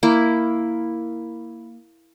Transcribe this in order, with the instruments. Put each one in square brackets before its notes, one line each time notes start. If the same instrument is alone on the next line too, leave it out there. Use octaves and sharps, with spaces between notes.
[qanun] A#3 E4